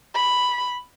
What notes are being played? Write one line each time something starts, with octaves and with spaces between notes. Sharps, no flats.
B5